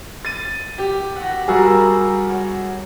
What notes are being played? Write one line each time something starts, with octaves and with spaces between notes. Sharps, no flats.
A6 D#7
G4 G5
F#4 F#5
G3 F#4 G#4 A#4 E5
C#5 F#5